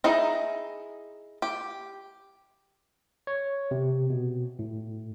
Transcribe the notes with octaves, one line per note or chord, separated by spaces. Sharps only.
D#4 E4 G#4 D#5 A#5
G4
C#5
C3
B2
A2